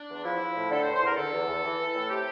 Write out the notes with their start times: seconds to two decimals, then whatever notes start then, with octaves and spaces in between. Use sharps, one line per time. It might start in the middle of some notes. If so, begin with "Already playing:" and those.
Already playing: D4
0.09 E2
0.24 F3 E4
0.40 F3
0.54 A2
0.70 D3 A4
0.82 C5
0.85 E2
0.93 C5
1.01 E2 A#4
1.17 D3 A4
1.32 E2
1.47 E2
1.63 E3
1.78 E3
1.94 A2
2.10 C3 G4